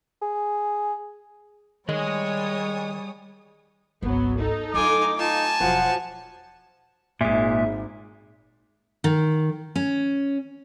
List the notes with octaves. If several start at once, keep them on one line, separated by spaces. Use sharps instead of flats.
G#4
D#3 G3 G#4 C#5 D#5 G#5 D#6
G#1 C#2 F#3 B3
D#4 A4
F#3 A3 F4 G#5 D6
D#4 F4 G#5 A5
E1 F3 F#3 F#5
G#1 A#2 G#3 E5
D#3
C#4